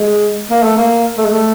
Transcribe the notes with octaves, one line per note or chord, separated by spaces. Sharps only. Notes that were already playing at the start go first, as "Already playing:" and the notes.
Already playing: G#3
A#3
A3
A#3
A3
G#3
A3